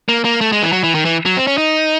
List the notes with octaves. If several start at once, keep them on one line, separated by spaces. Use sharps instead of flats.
A#3
A#3
A3
G#3
E3
F#3
E3
D#3
E3
F#3
C4
C#4
D#4